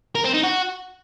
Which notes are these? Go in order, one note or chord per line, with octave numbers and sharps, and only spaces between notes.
A#4
C4
D#4
F#4